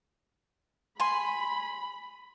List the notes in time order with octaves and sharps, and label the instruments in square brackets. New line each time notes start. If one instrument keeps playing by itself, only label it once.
[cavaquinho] G#5 C6 [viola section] B5